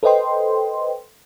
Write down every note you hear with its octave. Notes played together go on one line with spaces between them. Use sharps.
A4 B4 C5 D#5 G5 C6